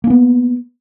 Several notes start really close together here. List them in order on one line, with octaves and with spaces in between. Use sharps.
A#3 D4 B3